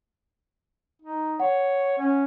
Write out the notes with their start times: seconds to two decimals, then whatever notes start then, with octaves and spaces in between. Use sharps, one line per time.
1.02 D#4
1.40 C#5 F#5
1.98 C#4